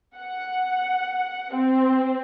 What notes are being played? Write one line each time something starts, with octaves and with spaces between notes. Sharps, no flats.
F#5
C4